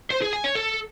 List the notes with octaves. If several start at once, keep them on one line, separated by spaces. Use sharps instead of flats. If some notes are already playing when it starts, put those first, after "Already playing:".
C5
G#4
G#5
C#5
A4